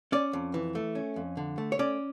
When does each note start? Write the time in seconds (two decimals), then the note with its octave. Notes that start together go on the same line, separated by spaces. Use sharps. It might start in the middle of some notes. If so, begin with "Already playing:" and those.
0.12 C#4 D5
0.33 F2
0.54 E3
0.75 A3
0.95 C#4
1.16 F2
1.37 D3
1.58 A3
1.72 C#5
1.79 C#4 D5